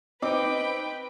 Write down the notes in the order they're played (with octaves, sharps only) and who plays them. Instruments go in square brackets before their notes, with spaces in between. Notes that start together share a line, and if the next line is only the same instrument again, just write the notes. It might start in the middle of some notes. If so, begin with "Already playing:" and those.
[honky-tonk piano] C4 D#4 D6 [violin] B4 G5